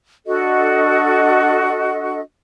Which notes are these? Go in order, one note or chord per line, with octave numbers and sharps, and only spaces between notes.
D4 F#4 A4 D#5